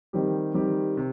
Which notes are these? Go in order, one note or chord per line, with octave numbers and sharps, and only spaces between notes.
D#3 G3 C4 G4
D#3 G3 C4 G4
C3